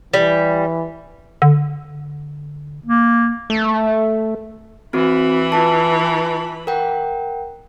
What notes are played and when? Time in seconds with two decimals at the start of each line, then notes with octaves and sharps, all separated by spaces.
0.14 E3 G3
1.42 D3
2.86 A#3
3.50 A3
4.93 E3 C4 F#4 B5
5.52 F4 B4 A5
6.67 A#4 F#5 G5